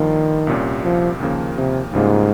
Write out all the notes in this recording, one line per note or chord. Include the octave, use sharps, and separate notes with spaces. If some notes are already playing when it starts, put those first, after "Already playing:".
Already playing: G2 D#3 F3 A#3 F4
C2 A#2 G3 C#4
F3
D#2 C#3 F3 A#3
C3
C#2 G#2 C#3 G3 A#3 F4